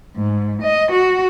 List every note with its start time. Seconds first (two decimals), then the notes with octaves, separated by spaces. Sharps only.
0.17 G#2
0.62 D#5
0.91 F#4